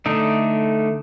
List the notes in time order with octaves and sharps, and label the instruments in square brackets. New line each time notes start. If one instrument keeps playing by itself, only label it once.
[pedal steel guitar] D3 A3 D#4